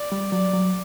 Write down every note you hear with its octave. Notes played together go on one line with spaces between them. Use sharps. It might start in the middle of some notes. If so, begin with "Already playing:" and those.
Already playing: D5
G3
F#3 D5
F#3